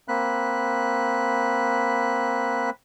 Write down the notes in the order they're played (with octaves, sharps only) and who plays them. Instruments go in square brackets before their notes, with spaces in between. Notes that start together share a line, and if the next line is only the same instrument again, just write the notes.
[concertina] A#3 C4 B5 F#6